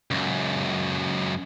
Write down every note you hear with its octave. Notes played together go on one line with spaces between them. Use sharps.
C#2 F#2